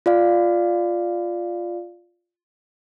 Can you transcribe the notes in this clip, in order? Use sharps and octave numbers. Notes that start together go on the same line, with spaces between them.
F4 D5 F5